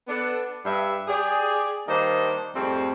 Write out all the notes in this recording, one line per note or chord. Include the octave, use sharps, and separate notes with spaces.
B3 D4 A4
G2 E5
G4 G#4 D5
D#3 G3 A#3 D4 C5 D#5
F2 G#2 G3 A3 C4